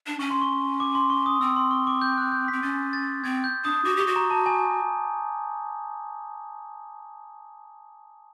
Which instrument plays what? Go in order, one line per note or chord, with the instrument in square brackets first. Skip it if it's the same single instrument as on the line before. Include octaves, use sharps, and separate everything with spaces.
[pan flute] D4
[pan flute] C#4 [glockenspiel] C#6
[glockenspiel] C6
C#6
D6
C6
C#6
D#6
[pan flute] C4 [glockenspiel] E6
[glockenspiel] C6
C#6
D6
G6
F#6
G6
[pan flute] C4 [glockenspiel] B6
[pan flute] C#4 [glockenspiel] A6
[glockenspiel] A6
[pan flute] C4 [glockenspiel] G#6
[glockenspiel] G6
[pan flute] D4 [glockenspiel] D#6
[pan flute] F#4 [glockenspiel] D6
[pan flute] G4 [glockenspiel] C#6
[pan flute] F#4
[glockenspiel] A#5
A5
G#5